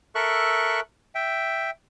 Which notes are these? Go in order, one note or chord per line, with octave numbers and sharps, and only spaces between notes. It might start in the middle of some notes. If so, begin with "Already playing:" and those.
A4 A#4 E5 C#6 F#6
E5 G5